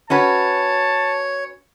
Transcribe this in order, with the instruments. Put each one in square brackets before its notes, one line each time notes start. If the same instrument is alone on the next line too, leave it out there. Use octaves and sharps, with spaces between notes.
[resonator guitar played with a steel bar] C#4 F#4 B4 [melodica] C#5 [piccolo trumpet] A5